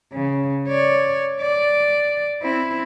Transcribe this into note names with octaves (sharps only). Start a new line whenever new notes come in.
C#3
C#5 D5
D5
C4 E4